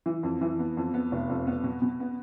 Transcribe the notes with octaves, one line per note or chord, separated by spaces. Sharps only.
E3
F2
E3
B3
F2
B3
F1
F2
B3
B2
B2
B3